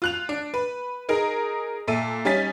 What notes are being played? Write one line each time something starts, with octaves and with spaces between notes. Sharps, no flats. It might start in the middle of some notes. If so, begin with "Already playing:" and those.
F4 F#6 F7
D4
B4
D#4 G#4 A#4
A#2 A4 E5 D#7
G3 C#4 D#4 G#5 A6 B6